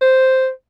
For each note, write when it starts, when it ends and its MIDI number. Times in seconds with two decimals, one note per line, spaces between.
0.01 0.49 72